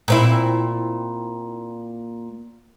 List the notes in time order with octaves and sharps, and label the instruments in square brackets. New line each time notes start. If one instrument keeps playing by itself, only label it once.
[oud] A#2 C4 E4